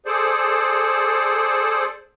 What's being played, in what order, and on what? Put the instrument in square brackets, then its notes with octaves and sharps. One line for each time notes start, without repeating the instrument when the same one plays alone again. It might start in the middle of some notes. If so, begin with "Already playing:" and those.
[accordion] G#4 A4 C5 D5